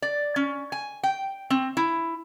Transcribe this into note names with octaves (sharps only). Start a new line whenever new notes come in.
D5
C#4
G#5
G5
C4
E4